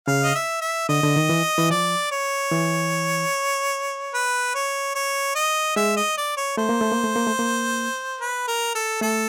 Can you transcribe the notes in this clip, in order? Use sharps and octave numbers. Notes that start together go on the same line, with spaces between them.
C#3 F5
D#5
E5
E5
D3 D#5
D3
D#3
E3
E3
F3 D5
C#5
E3
B4
C#5
C#5
D#5
G#3 E5
D#5
D5
C#5
A3 C5
A#3
A3
A#3
A3
A#3
A3
A#3
B4
A#4
A4
A3 A4